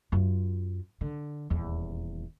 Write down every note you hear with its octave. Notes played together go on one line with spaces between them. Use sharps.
F#2 F4
D3
D#1 E2